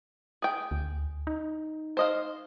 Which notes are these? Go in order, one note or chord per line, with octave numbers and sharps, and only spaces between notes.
G#4 G5
D2
D#4
C5 D#5 F5